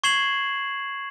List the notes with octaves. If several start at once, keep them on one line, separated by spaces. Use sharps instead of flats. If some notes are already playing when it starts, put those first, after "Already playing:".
C#6 G#6 C7 E7 F#7